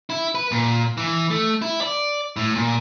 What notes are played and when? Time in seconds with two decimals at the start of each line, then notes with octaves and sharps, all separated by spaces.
0.10 E4
0.35 B4
0.52 A#2
0.97 E3
1.30 A3
1.62 E4
1.81 D5
2.36 A2
2.56 A#2